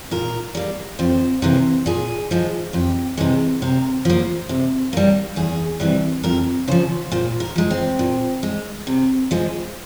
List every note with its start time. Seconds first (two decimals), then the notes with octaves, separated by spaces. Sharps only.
0.11 A#2 A#4
0.55 G3 A#3
0.99 F2 C5
1.42 C3 E3 A#3
1.86 A#2 G#4
2.31 F3 G#3
2.73 F2 G4
3.17 C3 E3 G#3
3.62 C3 A#4
4.05 F3 A#3
4.49 C3
4.93 G3 A#3
5.36 E2 G#4
5.80 C3 E3 G3
6.23 F2 A#4
6.68 C#3 F3 C5
7.12 A#2 C5
7.40 A#4
7.56 F3 G#3
7.70 C4
7.99 A#2
8.43 G#3
8.87 C3
9.31 F3 G#3